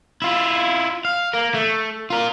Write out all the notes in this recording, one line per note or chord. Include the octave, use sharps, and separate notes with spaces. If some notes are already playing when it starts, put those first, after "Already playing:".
E4 F4
F5
A#3 A#4
A3
F4 A#4